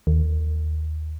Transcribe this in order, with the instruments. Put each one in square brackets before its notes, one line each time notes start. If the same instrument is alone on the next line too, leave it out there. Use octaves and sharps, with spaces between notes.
[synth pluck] D#2